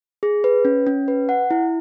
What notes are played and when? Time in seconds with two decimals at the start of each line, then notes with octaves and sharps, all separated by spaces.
0.23 G#4
0.44 B4
0.65 C#4
0.87 C#4
1.08 B4
1.29 F#5
1.51 E4